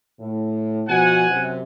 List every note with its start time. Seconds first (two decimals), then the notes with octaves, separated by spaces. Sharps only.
0.20 A2
0.88 B2 F3 F#4 F#5 G#5
1.29 F#2 C3